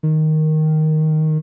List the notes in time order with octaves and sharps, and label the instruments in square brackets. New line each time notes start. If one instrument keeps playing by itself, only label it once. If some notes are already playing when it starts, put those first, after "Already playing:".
[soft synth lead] D#3